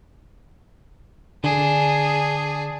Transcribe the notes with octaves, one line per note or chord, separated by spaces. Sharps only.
D3 D4 G#4